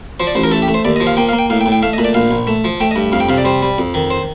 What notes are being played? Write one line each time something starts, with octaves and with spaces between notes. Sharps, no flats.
F3 C5
D5
A1 C5
A#4
A3 A4
G4
A3
C5
D#2 D5
D#5
F3
F5
A#3 G5
F5
A#3
G5
A2 F5
G5
A2
G5
A3 F5
D#5
A#2
D5
A#1 F5
A#1
A3
F3
A3 G5
D#5
G2
F2 F5
G5
C3 F5
D5
G3 C5
G3
F2
D#3
C5